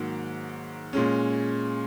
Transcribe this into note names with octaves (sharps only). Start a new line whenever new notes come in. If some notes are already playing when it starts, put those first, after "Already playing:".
Already playing: G#2 D#3 F#3 A#3
A#2 G#3 C#4